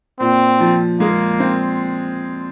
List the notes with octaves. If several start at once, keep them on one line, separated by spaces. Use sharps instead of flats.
A#2 C4
F3
G#3 A#3
C4